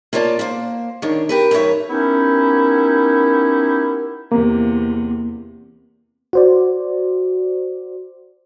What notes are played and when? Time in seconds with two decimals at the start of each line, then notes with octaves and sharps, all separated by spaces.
0.13 A#3 F4 C#5 D5 A5
0.39 A#3 C5
1.02 D#3 D4 C#5
1.29 G4 A#4 B4
1.51 F2 G#2 A#4 C#5 E5
1.89 B3 C#4 D#4 E4 G4 A#4
4.32 E2 C3 A#3
6.33 F#4 C5 D5